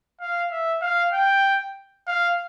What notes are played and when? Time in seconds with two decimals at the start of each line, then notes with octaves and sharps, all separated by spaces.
0.20 F5
0.51 E5
0.82 F5
1.13 G5
2.07 F5